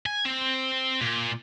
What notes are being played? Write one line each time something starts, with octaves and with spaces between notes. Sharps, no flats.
G#5
C4
A#2